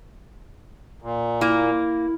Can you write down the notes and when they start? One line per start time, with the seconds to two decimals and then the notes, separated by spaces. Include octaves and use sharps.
1.02 A#2
1.41 A#3 E4